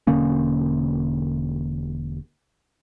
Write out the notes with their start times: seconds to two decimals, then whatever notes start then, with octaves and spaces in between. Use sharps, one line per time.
0.07 E1 D3 A#3 C#4